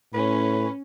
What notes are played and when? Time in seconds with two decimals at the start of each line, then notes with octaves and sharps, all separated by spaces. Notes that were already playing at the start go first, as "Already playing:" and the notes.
0.14 A2 C#4 B4